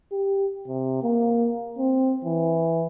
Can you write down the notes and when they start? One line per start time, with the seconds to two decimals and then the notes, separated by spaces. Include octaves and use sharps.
0.12 G4
0.68 C3
1.03 A#3
1.78 C4
2.24 E3